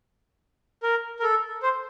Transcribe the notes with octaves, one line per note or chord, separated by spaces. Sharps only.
A#4
A#4
A4
C5